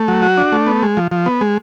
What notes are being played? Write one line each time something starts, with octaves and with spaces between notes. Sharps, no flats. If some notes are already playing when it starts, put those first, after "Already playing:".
Already playing: A3
F#3
F#4
D4
A3
B3
G#3
F3
F3
B3
G#3